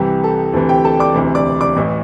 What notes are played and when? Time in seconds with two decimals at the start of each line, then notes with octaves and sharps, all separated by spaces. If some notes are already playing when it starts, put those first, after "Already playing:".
Already playing: C2 C3 E3 G4
0.24 A4
0.53 D2 C3 E3 A4
0.69 G4 G5
0.84 A4 A5
0.99 D5 D6
1.14 E1 D2 C3 E3
1.35 D5 D6
1.61 D5 D6
1.76 A1 A2 E3